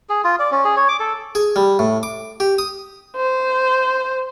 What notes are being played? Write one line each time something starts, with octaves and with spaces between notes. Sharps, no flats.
G#4
F4
D5
C#4
G#4
C#5
D6
A4
G#4
G3
A2
D6
G4
D#6
C5